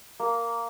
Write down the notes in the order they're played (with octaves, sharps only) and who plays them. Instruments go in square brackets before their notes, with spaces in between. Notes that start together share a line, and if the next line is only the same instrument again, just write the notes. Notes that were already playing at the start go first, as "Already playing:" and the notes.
[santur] A#3